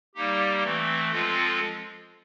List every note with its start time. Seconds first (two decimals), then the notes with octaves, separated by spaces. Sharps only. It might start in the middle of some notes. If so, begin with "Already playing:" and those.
0.15 G3 A#3 D#4 G4
0.63 E3 A3 C4
1.11 F3 G#3 C4 F4 A4